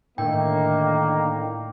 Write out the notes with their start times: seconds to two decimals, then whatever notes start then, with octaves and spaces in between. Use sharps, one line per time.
0.18 A2 D3 D#3 A#3 G5